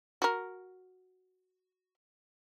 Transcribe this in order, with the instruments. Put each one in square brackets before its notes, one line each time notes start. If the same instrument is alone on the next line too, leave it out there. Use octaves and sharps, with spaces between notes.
[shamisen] F#4 A#4